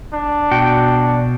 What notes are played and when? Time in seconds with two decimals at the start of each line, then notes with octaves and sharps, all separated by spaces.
0.13 D4
0.51 B2 F#4 G5